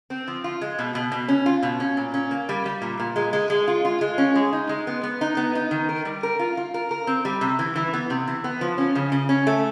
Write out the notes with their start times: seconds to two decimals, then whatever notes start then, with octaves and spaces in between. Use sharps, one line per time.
0.10 C4
0.28 F3
0.44 F4
0.61 G#3
0.79 B2
0.95 B2
1.12 B2
1.28 C#4
1.46 F4
1.63 B2
1.80 C#4
1.97 A#2
2.14 C#4
2.31 A#3
2.49 G3
2.66 G3
2.82 A#2
3.00 A#2
3.16 G#3
3.33 G#3
3.50 G#3
3.68 F4
3.85 F4
4.01 G#3
4.18 C#4
4.35 G#3
4.53 D#4
4.69 G#3
4.87 B3
5.03 B3
5.21 D#4
5.37 B3
5.55 D#4
5.71 D#3
5.89 A#4
6.05 G3
6.23 A#4
6.39 F4
6.57 F4
6.74 A#4
6.91 A#4
7.07 C4
7.25 G3
7.41 C3
7.59 E3
7.76 E3
7.93 B3
8.10 C3
8.28 E3
8.44 B3
8.61 F3
8.78 C#4
8.95 C#3
9.12 C#3
9.29 C#4
9.47 A3